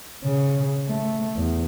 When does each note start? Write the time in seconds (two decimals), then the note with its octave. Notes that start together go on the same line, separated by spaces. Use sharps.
0.24 C#3
0.88 A3
1.36 E2